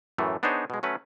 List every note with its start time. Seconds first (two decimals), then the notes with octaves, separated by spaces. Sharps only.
0.18 F#2 A2 E3 A3
0.43 B3 D4 D#4 G#4 C5 C#5
0.70 B2 G#3
0.83 F#3 A3 C#4 B4